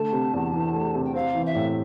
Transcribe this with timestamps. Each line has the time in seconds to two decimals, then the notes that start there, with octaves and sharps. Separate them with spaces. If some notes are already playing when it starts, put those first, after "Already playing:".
Already playing: D3 A3 A5
0.12 C3
0.34 E2
0.53 E3
0.74 A3
0.95 C3
1.04 G5
1.14 C4 F5
1.35 E3
1.46 E5
1.55 A2